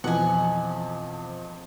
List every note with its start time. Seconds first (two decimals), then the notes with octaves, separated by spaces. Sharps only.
0.04 F2 B2 E3 F3 D#5 F#5 G#5